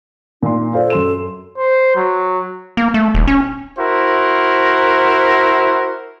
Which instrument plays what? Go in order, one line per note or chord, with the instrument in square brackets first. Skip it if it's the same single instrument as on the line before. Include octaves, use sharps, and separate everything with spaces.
[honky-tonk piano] A#2 C6 [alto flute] D#4
[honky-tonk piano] F4 C5 D5 [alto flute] A4
[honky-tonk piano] F#2 C6 E7
[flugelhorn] C5
F#3
[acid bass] A#3
A3
D#1
C#4
[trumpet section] E4 F#4 A#4 C5